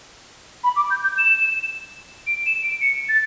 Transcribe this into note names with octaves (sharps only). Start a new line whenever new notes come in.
B5
D6
G6
G6
E7
D7
E7
D7
C#7
A6